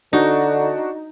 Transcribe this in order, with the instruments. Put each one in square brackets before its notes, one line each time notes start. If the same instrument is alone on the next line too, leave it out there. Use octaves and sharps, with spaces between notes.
[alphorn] D3 [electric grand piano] D4 F#4 [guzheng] D#4